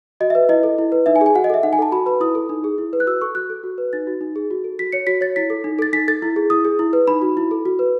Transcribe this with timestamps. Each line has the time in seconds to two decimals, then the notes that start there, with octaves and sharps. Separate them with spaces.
0.20 F#4 D#5
0.30 E5
0.35 B4
0.49 E4 D#5
0.63 A4
0.78 E4
0.92 B4
1.06 D#4 E5
1.16 G#5
1.21 G#4
1.26 G#5
1.35 F#4 F#5
1.44 D#5
1.50 A4 E5
1.63 D#4 F#5
1.73 G#5
1.78 A4 A5
1.92 F#4 B5
2.06 B4 B5
2.21 E4 D#6
2.35 A4
2.49 D#4
2.64 G#4
2.78 E4
2.93 B4
3.00 F#6
3.06 F#4 E6
3.21 A4 C#6
3.35 F#4 F#6
3.50 A4
3.64 F#4
3.78 B4
3.93 D#4 A6
4.07 F#4
4.21 D#4
4.36 G#4
4.51 F#4
4.64 A4
4.79 F#4 B6
4.92 C#5 C#7
5.07 F#4 B6
5.21 C#5 A6
5.36 E4 B6
5.50 A4
5.64 D#4
5.79 A4 A6
5.93 D#4 B6
6.08 A4 A6
6.22 E4
6.36 G#4
6.50 E4 D#6
6.65 G#4
6.79 E4
6.93 B4
7.07 D#4 B5
7.22 F#4
7.37 E4
7.51 A4
7.66 F#4
7.79 B4